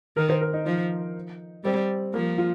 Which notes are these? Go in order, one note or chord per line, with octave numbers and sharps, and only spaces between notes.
D#3 A#4
C5
A#4
D#4
F3 D#4
G3 C4
F3 A#3
F4